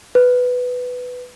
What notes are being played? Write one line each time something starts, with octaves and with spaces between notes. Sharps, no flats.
B4